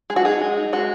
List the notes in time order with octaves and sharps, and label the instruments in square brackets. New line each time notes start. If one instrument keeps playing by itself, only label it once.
[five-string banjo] G#3 G#4
F#4
D#4 G#4
G#3
D#4
G#3 F#4